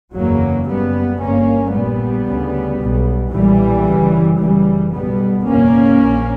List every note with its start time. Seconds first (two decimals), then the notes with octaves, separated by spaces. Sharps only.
0.14 F#1 E2 C#3 F#3 A#3
0.68 F#1 F#2 C#3 G3 B3
1.21 G1 G2 A#3 C#4
1.73 A#1 A#2 G3 B3
2.27 D2 C#3
2.81 B1 B2
3.33 B1 A#2 E3 G3
3.86 G1 F#2 C#3
4.39 F#1 F#2 C#3 E3 G3
4.92 B1 B2 G3 B3
5.45 F#1 E2 B2 A#3 C#4
5.99 A#1 A#2